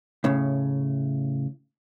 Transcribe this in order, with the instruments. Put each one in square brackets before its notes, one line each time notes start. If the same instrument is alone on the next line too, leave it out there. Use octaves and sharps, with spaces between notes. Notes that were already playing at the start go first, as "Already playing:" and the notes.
[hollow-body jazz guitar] A2 C#3